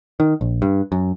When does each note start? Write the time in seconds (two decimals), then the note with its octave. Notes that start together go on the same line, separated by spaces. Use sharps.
0.20 D#3
0.41 A#1
0.62 G2
0.92 F#2